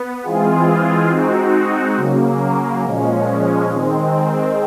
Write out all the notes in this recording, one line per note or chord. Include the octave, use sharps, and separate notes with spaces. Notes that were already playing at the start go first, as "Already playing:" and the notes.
Already playing: B3
E3 G#3 C4 F4 G#4
G#3 C4 D#4 F#4
C#3 F#3 A#3
A#2 F3 G#3 C#4
D#3 G#3 C4